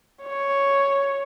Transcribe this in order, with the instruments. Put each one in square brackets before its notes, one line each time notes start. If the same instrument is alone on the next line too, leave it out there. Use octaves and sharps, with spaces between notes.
[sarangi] C#5